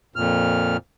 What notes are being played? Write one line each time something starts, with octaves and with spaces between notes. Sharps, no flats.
F2 A#2 F6